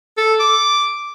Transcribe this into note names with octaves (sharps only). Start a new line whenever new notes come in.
A4
D6